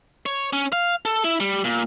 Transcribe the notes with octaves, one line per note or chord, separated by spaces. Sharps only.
C#5
C#4
F5
A4
E4
G3
A#2